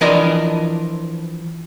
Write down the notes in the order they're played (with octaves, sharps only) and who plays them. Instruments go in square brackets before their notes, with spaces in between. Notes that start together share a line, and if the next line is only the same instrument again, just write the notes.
[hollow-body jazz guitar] E3 F3 D4 A#4 D5 D#5